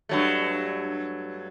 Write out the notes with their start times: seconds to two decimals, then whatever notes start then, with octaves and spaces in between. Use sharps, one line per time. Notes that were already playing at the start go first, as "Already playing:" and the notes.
0.09 G2 F#3 A3